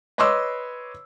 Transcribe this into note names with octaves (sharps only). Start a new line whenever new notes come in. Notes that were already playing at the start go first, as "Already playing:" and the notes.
B4 C#5 D#5 C6 D6 E6